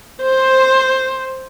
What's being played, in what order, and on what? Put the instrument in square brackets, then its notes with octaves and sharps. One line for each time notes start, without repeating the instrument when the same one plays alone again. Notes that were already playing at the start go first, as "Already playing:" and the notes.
[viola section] C5